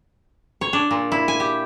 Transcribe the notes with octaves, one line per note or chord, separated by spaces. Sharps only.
C#5
D4
A#2
E4
G#5
G4